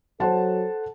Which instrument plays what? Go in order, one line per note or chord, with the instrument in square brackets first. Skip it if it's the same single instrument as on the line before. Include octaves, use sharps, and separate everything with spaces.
[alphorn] F#3 [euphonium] A4 [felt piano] C5 F#5 A5